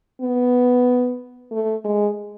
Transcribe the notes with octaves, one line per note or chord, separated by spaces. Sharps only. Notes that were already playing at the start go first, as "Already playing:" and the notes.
B3
A3
G#3